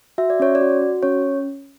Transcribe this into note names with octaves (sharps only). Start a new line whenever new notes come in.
F#4 E5
D5
C#4 C#5
D5
F#4
F#4
C#4 C#5